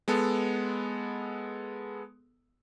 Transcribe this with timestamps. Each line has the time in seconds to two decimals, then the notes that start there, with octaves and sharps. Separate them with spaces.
0.08 G#3 B3 A4